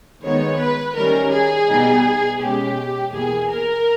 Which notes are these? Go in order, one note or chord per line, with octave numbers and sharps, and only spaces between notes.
D#3 G#3 B3 D#4 C#5
B4
D#3 G3 C#4 A#4
G#4
B2 G3 B3 D#4
B2 G#3 C#4 G4
E2 B2 A#3 G#4
A#4